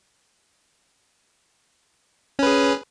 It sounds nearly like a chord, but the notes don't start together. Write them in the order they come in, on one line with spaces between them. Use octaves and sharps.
C#4 B4 G#4